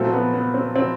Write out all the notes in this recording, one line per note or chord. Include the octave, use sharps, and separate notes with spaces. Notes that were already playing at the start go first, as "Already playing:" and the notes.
Already playing: A#2 F#3 A3 C4
B3
B3
C4
C4